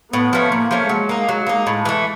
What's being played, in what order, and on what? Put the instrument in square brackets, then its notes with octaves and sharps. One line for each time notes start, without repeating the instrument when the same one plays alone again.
[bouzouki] A2 [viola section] B3
[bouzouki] F3 A3 C#4
[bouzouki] A2 [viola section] A#3
[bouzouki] F3 A3 C#4
[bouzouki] F#3 [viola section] G#3
[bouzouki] A#3 D#4
F#3
A#3 D#4
A2
E3 A3